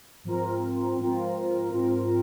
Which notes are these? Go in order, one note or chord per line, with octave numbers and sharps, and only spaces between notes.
G#2 F3 C4 F4 A#4
G#2 F3 C4 F4 A#4
G#2 F3 C4 F4 A#4